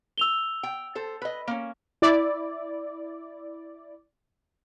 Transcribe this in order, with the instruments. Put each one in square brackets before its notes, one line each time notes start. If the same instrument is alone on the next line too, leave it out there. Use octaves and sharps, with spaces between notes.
[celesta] E6 F7 G7
[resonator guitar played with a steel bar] G5
A4 C5
B4 D#5
A#3 C#4
[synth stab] E4 D5